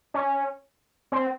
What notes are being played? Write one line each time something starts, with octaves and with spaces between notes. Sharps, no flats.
C#4
C4